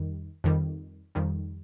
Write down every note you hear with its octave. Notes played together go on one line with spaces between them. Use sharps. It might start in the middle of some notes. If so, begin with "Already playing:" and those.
Already playing: F2 D#3 G3
F2 D#3 G3
F2 D#3 G3